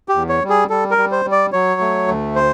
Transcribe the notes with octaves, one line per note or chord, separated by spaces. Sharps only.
G4
E2
C#5
G3
G#4
G3 A4
A#4
G3
C5
G3
D5
F#3 C#5
A3
D2
C5